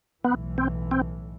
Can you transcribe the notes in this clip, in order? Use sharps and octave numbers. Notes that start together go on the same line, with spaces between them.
B1 A2 E3 B3
C4
C4